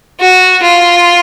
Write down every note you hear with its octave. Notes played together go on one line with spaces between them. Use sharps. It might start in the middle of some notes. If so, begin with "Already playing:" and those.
F#4
F4